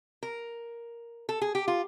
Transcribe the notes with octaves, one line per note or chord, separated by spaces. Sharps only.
A#4
A4
G#4
G4
F4